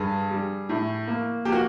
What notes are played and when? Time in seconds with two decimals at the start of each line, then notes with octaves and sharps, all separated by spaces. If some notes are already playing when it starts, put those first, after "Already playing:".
Already playing: G2 G#4
0.31 G3
0.69 A2
1.08 A#3
1.45 A#3 G4
1.52 F#4